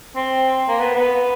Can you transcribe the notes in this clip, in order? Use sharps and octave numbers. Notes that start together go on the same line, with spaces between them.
C4
A#3
B3
B3